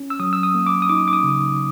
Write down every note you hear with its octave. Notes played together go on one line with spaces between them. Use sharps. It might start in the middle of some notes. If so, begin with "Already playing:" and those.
Already playing: C#4
E6
F#3 D#6
E6
D#6
A#3
D6
D#6
D#4 D6
D6
D#6
C#3